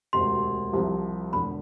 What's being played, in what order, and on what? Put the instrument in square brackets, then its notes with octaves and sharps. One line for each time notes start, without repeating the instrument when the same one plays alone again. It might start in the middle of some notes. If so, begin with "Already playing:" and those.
[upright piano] E1 D2 C3 [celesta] C6
[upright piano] C2 C3 F3
[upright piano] E1 E2 D3 [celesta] B5